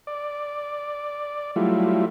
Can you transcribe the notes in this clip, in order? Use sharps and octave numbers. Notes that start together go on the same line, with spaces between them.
D5
F#3 G3 A3 E4 F4